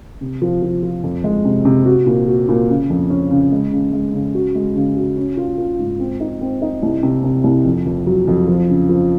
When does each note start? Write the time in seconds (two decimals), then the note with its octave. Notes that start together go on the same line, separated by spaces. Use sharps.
0.21 C3
0.42 F3
0.62 F3
0.83 F3
1.03 F2
1.24 G#3
1.45 C3
1.65 C3
1.86 F#4
2.06 A#2
2.28 F#4
2.49 A#2
2.69 C#3
2.90 F2
3.10 C#4
3.31 C#3
3.52 G#3
3.72 C#3
3.93 G#3
4.14 C#3
4.35 F#4
4.55 G#3
4.76 C#3
4.96 F#4
5.17 C#4
5.37 F4
5.58 F4
5.79 G#2
5.99 C4
6.20 D#4
6.41 C4
6.62 D#4
6.82 C2
7.03 C3
7.24 C3
7.44 C2
7.65 F2
7.86 F2
8.06 F#3
8.28 F2
8.48 F3
8.68 C#3
8.89 F3